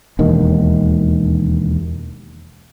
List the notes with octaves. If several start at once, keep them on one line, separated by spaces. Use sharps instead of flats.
E1 D#2 D#3